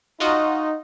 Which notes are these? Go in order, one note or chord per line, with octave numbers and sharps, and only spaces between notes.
D#4 F4 F#4 D#5